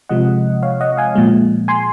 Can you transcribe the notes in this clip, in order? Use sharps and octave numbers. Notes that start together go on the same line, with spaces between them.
C3 F3 G#3 D#5 F#5
C#5 F5
D#5 F#5
F5 G#5
A#2 F3 G#3
G#5 C6